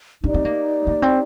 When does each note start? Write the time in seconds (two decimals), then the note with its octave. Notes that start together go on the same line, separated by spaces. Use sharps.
0.23 D4 D#4 G4 D5
0.34 C4
0.45 A#3
0.87 A#3
1.02 C4